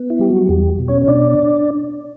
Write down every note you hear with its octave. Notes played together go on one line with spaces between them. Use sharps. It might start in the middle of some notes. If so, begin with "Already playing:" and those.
Already playing: B3
E4
G3 G4
F#3 F#4
E2 G3 G4
B2
C#4 C#5
C#5
B2 D4 D5